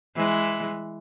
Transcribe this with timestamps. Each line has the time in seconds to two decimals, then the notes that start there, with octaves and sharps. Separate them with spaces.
0.16 E3 G#3